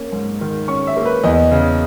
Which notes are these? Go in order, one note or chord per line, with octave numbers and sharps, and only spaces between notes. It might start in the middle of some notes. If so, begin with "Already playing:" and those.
Already playing: A#3 C#4
G#2
D#3
C#4 C#6
E5
A#3
B4
E2 D#5
C#3